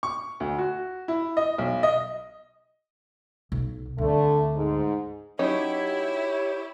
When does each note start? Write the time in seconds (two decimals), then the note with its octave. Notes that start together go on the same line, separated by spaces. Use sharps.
0.03 C#6
0.40 D2
0.58 F#4
1.08 E4
1.37 D#5
1.58 B1
1.83 D#5
3.52 B1
3.98 D2 D3 A3 C4
4.55 G#2
5.39 F#3 C#4 D#4 E4 G4 C#5